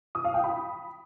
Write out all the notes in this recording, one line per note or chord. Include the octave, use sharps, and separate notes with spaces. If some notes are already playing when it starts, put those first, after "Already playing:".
D#6
F5
G5
B5